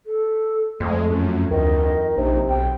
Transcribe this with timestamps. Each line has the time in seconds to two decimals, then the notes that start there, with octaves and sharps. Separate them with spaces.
0.06 A4
0.80 F2 G#3 A3
1.10 F#2
1.51 D2 D#3 D#5
2.17 A#1 C3 D#4
2.48 B1 G5